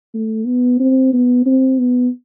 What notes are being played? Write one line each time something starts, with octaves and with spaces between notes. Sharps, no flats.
A3
B3
C4
B3
C4
B3